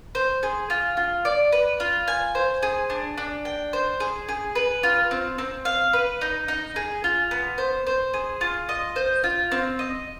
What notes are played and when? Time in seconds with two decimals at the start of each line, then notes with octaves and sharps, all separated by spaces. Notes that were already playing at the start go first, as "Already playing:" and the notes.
0.15 C5
0.43 G#4
0.70 F4
0.97 F4
1.25 D5
1.52 B4
1.80 F4
2.08 G#5
2.35 C5
2.63 G#4
2.90 D4
3.18 D4
3.45 G5
3.73 C5
4.00 G#4
4.29 G#4
4.55 B4
4.83 F4
5.11 C4
5.38 C4
5.65 F5
5.93 B4
6.21 D#4
6.48 D#4
6.76 G#4
7.04 F4
7.31 B3
7.58 C5
7.87 C5
8.14 G#4
8.41 F4
8.69 D#5
8.96 C5
9.24 F4
9.52 C4
9.79 D#5